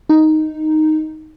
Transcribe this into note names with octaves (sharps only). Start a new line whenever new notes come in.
D#4